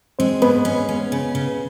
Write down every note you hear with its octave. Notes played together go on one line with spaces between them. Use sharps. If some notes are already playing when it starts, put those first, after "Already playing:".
G#3 C4 C5
G#2 B3 B4
C#4
C#4
C#3
C#3